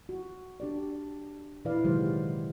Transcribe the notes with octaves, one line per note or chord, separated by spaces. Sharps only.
F#4
D4 G4 D5
A#2 E3 E4 B4 D5 F5
C3 D#3 F#3 G#3 G4 C5